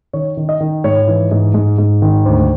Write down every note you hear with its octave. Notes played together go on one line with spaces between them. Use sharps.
D#3 C#5
D#3
D#5
D#3
G#2 C#5
E3
G#2
G#2
G#2
D#3
D2 C5